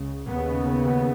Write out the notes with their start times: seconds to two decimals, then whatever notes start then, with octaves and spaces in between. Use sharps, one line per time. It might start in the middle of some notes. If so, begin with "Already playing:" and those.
Already playing: C#2 C#3
0.28 D#2 C#3 B3